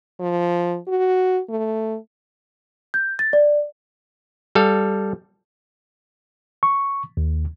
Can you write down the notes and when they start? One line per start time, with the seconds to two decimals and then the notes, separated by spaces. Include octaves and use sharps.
0.20 F3
0.88 F#4
1.50 A3
2.94 G6
3.19 A6
3.33 D5
4.55 G3 A4 F5
6.63 C#6
7.17 D#2